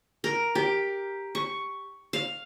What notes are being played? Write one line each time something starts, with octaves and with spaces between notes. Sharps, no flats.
A#4
G4
C#6
F5